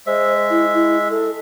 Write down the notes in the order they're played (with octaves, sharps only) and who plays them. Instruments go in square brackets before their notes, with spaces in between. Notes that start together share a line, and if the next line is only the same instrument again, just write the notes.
[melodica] G#3 E5 [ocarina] C5
[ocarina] E4
E4
A4